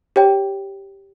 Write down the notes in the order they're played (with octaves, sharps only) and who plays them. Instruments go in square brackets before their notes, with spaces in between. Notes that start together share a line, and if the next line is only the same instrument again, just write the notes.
[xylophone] G4 C#5 G5